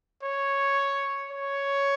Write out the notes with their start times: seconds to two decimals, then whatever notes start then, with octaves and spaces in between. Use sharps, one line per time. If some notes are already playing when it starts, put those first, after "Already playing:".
0.23 C#5
1.31 C#5